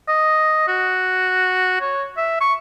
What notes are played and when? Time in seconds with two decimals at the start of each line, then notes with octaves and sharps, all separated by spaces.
0.08 D#5
0.68 F#4
1.81 C#5
2.17 E5
2.41 C#6